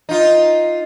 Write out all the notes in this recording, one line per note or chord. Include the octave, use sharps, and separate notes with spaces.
D#4 F4